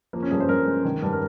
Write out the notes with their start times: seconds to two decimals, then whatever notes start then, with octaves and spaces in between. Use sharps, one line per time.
0.13 F3 A#3
0.23 C#4
0.31 G2 G#4
0.40 C5
0.49 G2 A#4
0.67 G#3
0.85 D#3
1.02 G2
1.13 A#4